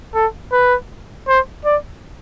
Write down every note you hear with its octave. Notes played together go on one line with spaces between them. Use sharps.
A4
B4
C5
D5